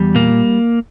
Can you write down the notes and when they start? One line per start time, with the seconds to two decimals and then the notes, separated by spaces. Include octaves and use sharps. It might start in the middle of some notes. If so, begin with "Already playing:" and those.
Already playing: E2 G3
0.15 A#2 A#3